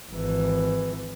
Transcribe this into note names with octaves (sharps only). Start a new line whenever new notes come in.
G#1 E3